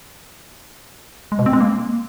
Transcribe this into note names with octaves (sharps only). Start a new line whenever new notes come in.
G#3
B2
C4
G#3
A#3